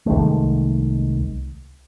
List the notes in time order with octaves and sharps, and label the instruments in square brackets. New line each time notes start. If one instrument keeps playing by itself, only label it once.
[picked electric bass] C2 D#3 G#3 A3